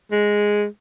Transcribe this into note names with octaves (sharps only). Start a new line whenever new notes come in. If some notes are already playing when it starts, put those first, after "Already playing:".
G#3